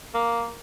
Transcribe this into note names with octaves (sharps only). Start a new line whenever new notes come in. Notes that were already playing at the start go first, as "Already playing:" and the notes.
A#3